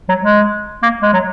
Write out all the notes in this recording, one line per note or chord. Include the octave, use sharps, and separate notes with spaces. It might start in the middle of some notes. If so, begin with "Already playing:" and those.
F#3
G#3
A#3
G#3
F#3